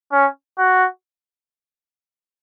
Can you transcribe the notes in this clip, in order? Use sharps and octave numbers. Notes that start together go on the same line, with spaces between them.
C#4
F#4